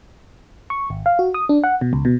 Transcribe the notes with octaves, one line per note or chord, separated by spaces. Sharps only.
C#6
G#1
F5
F#4
D#6
D4
F#5
B2
C#2
B2